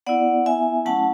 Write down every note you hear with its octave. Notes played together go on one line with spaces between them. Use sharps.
B3 E4 D5 F#5
E5 G#5
F#3 A3 C#4 E4 F#5 A5